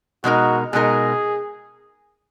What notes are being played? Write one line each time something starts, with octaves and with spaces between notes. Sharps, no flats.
B2 G#3 D#4 F#4 A#4
B2 G#3 D#4 G#4 A#4